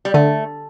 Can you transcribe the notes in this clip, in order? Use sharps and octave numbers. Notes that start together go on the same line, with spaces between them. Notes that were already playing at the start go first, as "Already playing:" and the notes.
G3
D3 A3